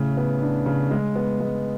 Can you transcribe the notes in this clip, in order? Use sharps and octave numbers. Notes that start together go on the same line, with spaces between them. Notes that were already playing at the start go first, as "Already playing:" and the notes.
Already playing: A2 C#3
B3
D4
C#3
G#3
B3
G#3